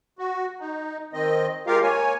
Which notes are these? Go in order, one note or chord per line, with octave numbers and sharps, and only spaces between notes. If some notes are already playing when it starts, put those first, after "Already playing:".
F#4
D#4
D#3 C4 D#5
G#3 F4 G4 A#4 F5
A#3 C#5 G#5